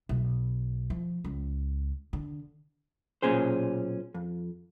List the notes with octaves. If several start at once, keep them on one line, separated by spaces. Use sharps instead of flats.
B1
F3
C#2
D3
B1 A#2 C#4 G#4 C5
F2